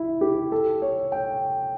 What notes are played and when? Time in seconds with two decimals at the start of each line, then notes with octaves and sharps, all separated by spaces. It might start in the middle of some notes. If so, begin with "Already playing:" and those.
Already playing: E4
0.21 G4
0.52 A4
0.82 C#5
1.12 G5